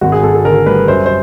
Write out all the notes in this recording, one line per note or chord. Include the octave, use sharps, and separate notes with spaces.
G#1 F#4
G#4
G#1 A4
A4
D3 A#4
G3 B4
F#2 C5
C5